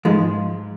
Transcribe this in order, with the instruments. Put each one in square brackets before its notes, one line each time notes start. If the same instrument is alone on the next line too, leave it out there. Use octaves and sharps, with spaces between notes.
[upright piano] G#2 [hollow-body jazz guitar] F3 G#3